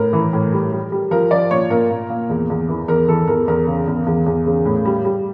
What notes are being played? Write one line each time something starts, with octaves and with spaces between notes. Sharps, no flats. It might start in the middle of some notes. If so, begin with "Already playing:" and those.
Already playing: A2 A#4
E3
A2
G3
G3
G3
F3 A#4
F3 D5
A#2 C#5
A#2 A#4
A#2
A#2
E2
E2
E3
E2 A#4
E3 A4
E2 A#4
E2 A#4
C#3
E2
E2
E2
C#3
A2
G3
G3